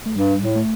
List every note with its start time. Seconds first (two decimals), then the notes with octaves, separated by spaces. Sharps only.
0.06 A3
0.16 G2 G3
0.41 A2
0.55 A3